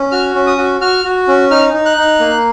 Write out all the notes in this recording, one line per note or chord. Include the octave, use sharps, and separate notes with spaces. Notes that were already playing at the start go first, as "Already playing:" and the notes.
Already playing: C#4
F#4 F6
C#4
D#6
F#4
F#4 F6
F#4
C#4
D#4 F6
D#4
F#6
D#4
A#3